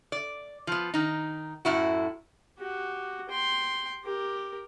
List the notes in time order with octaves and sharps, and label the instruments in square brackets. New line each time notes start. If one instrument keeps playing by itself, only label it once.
[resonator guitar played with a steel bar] D5
F3 B3
D#3 D#4
F#2 A2 E4 F#4
[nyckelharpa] F#4 G4
G5 C6
G4 A#4